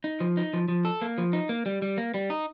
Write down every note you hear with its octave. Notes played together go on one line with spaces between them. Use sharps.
D#4
F3
D#4
F3
F3
A4
A#3
F3
D#4
A#3
G3
G3
A#3
G3
D#4